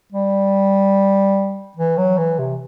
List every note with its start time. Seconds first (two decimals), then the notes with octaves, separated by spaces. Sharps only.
0.12 G3
1.77 E3
1.98 F#3
2.18 E3
2.39 C3